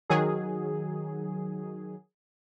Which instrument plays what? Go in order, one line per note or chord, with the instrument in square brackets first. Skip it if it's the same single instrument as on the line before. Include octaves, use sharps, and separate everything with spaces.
[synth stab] D#3 F#3 G#4